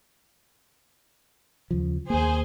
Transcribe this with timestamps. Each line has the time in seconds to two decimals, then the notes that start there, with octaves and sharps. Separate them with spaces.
1.71 D#2 C#3 F3
2.10 D#2 A#3 G#4 C5